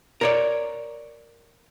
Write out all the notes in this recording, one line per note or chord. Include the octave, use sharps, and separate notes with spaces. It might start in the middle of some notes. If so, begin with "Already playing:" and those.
A#4 C#5 D5